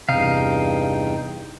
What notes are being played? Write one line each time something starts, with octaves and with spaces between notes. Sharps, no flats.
E2 G2 C3 D#4 F5 G5